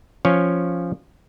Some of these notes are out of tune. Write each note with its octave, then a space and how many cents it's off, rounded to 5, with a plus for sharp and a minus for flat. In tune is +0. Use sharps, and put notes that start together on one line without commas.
F3 +0 C#4 +0 C#5 +0